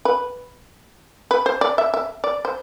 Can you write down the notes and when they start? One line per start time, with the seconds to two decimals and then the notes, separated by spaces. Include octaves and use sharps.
0.05 B4
1.31 B4
1.46 C5
1.61 D5
1.78 E5
1.94 E5
2.24 D5
2.45 C5